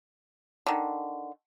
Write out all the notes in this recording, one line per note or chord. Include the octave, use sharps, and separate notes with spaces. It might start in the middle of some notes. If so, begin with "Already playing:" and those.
D3 D#3